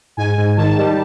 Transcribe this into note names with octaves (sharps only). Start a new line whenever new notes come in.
G#2 G#5
G#2
D#3 A5
G3